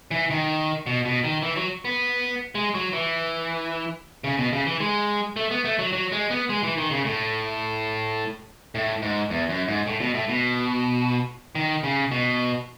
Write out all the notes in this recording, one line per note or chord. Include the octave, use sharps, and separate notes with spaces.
E3
D#3
B2
B2
D#3
E3
F#3
B3
G#3
F#3
E3
C#3
B2
C#3
E3
G#3
A3
B3
A3
F#3
F#3
G#3
B3
G#3
E3
D#3
C#3
A2
A2
G#2
E2
F#2
G#2
A2
B2
A2
B2
D#3
C#3
B2